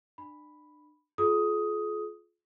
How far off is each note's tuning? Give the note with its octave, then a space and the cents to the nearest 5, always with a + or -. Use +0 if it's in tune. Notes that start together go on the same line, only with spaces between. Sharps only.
D4 +35 B5 +0
F4 +0 G#4 +40 D#6 +10